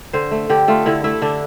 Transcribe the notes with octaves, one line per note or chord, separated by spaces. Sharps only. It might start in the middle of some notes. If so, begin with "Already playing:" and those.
D3 C5
A3
D3 G4
A3 F4
D3 E4
A3 E4
D3 D4